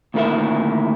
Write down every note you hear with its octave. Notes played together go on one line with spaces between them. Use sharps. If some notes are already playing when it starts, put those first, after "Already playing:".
D2 A#2 D#3 E4 A#4 E5